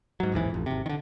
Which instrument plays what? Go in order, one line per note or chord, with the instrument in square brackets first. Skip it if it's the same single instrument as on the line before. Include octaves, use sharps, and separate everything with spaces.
[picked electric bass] G#2 F#3
A1 D#2 G#2 E3
A1 F2
G#1 C3
D3 D#3